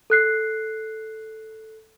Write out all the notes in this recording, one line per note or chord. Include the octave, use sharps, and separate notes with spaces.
A4 F#6 C7